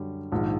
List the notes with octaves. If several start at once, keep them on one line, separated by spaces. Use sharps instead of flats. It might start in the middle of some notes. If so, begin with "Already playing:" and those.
Already playing: F#2 D3 G3
A#1 G#2 D#3